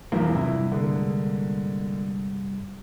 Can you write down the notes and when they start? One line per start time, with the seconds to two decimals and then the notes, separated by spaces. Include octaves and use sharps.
0.12 B1 E2 G2 F3 A#3
0.35 G2 C3 E4
0.72 D3 G#3 A#3